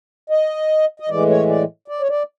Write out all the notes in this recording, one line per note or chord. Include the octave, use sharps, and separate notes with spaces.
D#5
D#5
A2 E3 G#3 D5
C#5
D5
D5
C#5
D5